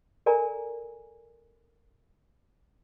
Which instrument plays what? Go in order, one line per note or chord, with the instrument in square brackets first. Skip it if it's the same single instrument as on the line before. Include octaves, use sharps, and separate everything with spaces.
[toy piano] A4 A#4 D5 G#5 A#5